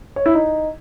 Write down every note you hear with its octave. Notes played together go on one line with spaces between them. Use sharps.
C#5
E4
D#4